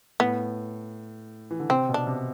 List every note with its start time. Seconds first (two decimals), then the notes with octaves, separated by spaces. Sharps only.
0.20 A2 B3
1.51 E3
1.60 D3
1.70 C3 C4
1.89 B2
1.94 D4
2.07 C3